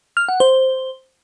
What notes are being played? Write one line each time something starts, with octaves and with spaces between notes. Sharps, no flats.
F6
F#5
C5